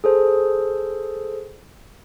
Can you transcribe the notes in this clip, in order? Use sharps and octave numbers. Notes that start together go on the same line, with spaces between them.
G#4 A4 C5